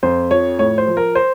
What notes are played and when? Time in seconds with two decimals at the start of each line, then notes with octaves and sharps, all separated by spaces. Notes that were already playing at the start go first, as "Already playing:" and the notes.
0.03 F2 C5
0.31 F3 C#5
0.59 A2 C#5
0.78 C5
0.87 F3
0.97 A#4
1.15 C5